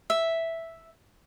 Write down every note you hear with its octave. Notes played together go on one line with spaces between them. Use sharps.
E5